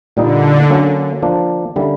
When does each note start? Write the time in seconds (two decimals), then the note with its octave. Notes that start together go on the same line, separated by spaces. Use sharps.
0.16 A#2 D3 G3 A#3 D#4
0.70 F#3 A#3 C#4
1.23 F3 A#3 D4
1.76 D3 G3 A#3 C#4 E4